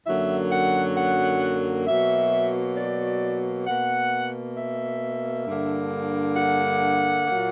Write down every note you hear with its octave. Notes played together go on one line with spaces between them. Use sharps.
F#2 D3 F#3 A#3 E5
F#5
F#5
B2 F#3 A#3 E5
D5
B2 A#3 F#5
E5
G2 D3 A#3
F#5
A#2 F#3 A#3